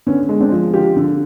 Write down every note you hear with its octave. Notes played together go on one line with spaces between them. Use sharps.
D3 B3 C#4
G#3
C4 D4
F3
D3 F4 G4
D3